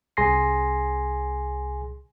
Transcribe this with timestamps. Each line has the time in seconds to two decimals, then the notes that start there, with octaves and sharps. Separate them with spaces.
0.17 C2 G#4 G#5 C6 A#6 C7